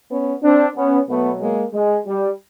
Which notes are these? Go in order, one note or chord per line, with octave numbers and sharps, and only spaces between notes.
B3 C#4
C4 D4
B3 C#4
B2 F#3 A3 B3
G#3 A#3
G#3
G3